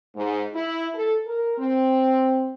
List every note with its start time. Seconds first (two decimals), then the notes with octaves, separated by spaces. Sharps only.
0.16 G#2
0.54 E4
0.95 A4
1.26 A#4
1.58 C4